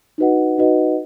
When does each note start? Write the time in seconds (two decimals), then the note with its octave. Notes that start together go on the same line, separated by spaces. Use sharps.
0.18 D#4 F#4 B4 D#5 F#5
0.58 D#4 F#4 B4 D#5 F#5